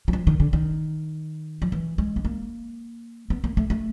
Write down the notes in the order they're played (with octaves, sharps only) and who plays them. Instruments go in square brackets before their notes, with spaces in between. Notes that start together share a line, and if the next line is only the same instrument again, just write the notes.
[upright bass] F#3
F3
D#3
D3
D#3
F3
E3
G#3
B3
A#3
B3
A#3
A3
A3